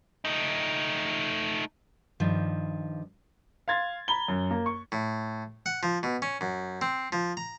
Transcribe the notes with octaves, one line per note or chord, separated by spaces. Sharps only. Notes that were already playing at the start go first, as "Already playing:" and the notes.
A3 D#4
G2 D#3 F3
F5 C6 G#6 A6
A#5 B5 G7
F#2
A#3
C#6
A2
F#5
F3
B2
C#4
F#2
C4
F3
A#5